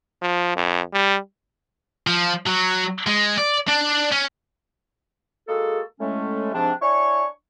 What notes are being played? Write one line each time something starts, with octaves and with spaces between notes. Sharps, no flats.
F3
F2
G3
F3
F#3
G#3
D5
D4
C#4
G#3 A#3 F#4 G#4 A4
A2 G#3 A3 C#4
G#2 C3 F3 C4 D4
D4 E4 C#5 G#5 C#6